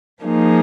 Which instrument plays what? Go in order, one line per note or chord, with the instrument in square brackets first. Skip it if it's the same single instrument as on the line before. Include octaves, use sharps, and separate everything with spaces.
[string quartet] F3 A#3 D#4 G#4